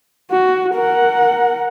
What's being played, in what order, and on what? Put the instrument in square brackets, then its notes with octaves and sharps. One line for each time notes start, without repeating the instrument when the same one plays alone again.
[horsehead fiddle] F#4
A#4 F#5